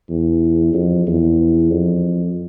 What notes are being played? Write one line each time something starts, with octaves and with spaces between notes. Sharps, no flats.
E2
F2
E2
F2